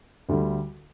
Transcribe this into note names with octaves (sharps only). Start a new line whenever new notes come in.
D2 D3 G3